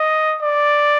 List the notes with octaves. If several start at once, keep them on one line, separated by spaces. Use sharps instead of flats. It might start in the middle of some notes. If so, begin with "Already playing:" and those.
Already playing: D#5
D5